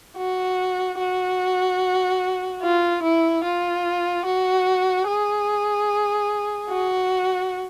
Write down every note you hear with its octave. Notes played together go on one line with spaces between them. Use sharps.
F#4
F#4
F4
E4
F4
F#4
G#4
F#4